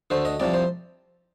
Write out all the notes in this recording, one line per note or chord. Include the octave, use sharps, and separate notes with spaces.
D2 D3 A3 C5
D#5
C2 C3 F3 D5
C5